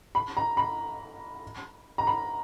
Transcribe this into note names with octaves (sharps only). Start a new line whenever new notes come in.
B5
A#5
B5
A#5
B5